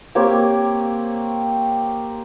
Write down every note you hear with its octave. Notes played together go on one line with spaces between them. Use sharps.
A#3 C4 G4 C#5